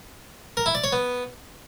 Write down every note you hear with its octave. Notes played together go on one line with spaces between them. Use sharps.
A#4
E4
D5
C#5
B3